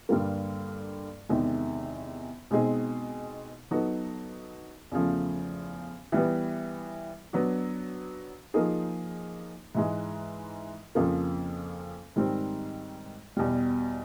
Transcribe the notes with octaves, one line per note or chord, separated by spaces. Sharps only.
G2 D3 G3 A#3
E2 C3 D#3 G#3
B2 G#3 C4 D#4 G#4
F#3 B3 D#4 F#4 A4
E2 C#3 F3 A3
E3 G3 B3
F#3 B3 D4 F#4
F3 A#3 D#4 G#4
G#2 E3 G#3
F2 C#3 F3 A#3
G#2 D#3 G3 C4
E2 B2 G3